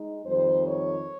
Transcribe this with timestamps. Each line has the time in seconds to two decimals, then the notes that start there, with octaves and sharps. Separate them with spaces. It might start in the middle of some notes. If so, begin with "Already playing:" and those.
Already playing: G#3 D#4
0.26 F2 D#3 G3 C5
0.66 C#5